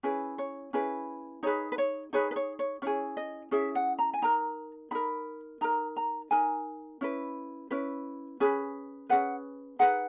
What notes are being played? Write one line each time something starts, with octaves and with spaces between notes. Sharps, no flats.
C#4 E4 G#4 B4
C#5
C#4 E4 G#4 B4
D#4 G#4 B4 C#5
B4
C#5
D#4 G#4 B4 C#5
B4
C#5
C#5
C#4 E4 G#4 C#5
D#5
C#4 E4 G#4 E5
F#5
A#5
G#5
D#4 A#4 A#5
D#4 A#4 B5
D#4 A#4 A#5
A#5
D#4 A#4 G#5
C#4 E4 B4
C#4 E4 B4
C#4 G#4 B4
C#4 G#4 B4 F#5
D#4 G#4 B4 F#5